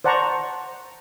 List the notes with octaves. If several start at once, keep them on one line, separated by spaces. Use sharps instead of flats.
C5 D5 F#5 A5 A#5 C#6